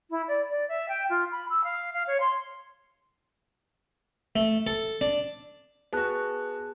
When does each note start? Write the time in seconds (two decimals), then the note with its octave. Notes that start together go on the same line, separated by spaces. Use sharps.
0.10 E4
0.27 D5
0.49 D5
0.68 E5
0.88 G5
1.09 F4
1.31 B5
1.50 E6
1.64 F5
1.93 F5
2.07 C#5
2.20 C6
4.36 A3
4.67 A4
5.01 D4
5.93 B3 F#4 G#4 A5 F#6